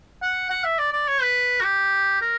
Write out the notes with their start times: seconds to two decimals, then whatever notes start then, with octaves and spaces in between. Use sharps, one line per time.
0.22 F#5
0.50 F#5
0.64 E5
0.78 D5
0.93 D5
1.08 C#5
1.22 B4
1.61 F#4
1.64 G4
2.21 A#4